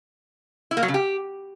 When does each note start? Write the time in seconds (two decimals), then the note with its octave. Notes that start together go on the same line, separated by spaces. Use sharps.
0.71 E4
0.77 A#3
0.83 F#3
0.88 C#3
0.94 G4